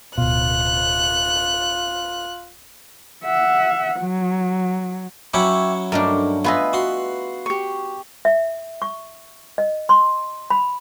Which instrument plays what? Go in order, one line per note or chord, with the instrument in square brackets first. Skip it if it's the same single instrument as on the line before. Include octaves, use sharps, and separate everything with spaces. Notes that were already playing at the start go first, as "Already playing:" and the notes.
[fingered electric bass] D1 B2 [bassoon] F4 [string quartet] F#6
[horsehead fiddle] E5 F#5
F#3
[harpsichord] F#3 C#4 E4 [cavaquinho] E5 G5 D6 [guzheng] B5
[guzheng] G2 A3 D4 [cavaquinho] D#4 A#4
[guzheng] B3 G#4 D#5 [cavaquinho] F4 B4 E5
[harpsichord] F#4 C6
[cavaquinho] G4 C#6
[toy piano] E5
C#6
D#5
C6
B5